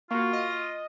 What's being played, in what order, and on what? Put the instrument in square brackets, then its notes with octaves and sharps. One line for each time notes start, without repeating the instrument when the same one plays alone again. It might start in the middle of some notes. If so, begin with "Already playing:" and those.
[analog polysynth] A#3 F#4 [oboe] F4 [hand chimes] F5 C#6
[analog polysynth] D#5 [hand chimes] F6